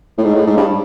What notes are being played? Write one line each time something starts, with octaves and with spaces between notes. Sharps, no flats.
A2
G#2
A2
G#2
G2